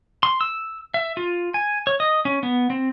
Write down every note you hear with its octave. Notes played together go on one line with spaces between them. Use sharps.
C6
E6
E5
F4
G#5
C#5
D#5
C#4
B3
C4